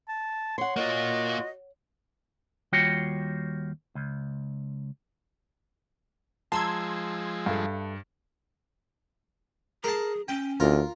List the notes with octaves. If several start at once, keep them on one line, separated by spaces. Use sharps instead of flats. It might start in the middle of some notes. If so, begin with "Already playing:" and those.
A5
C#5 F#5 C6
A#3 F4 F#4 D#5
D#2 G3 F4 F#4 C#5 G5
C#2
F3 G#3 A5 A#5 C6 E6 G#6
G2 A4 E5 F5
G#4 A#4 A5
C#4 G5
D2 F4 A#4